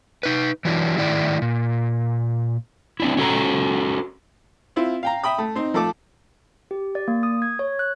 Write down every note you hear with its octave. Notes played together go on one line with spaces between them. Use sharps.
D#4 B4
E3 F#3 D4 E4
A2 D#3 E4 D5
A#2
C4 D4 E4
C#4 F#4 A4 A#5
C4 E4 F4
F5 G5 A#5
E5 G5 B5 D#6
A3
C4 D#4
F3 A3 A4 D6
G4
D5
A#3
D#6
G#6
C#5
F#6